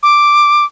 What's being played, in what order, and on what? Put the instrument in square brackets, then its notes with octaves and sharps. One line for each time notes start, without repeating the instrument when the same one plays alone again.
[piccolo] D6